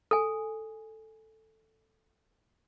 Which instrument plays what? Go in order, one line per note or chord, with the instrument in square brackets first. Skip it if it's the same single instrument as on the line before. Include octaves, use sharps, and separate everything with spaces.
[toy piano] A4 G#5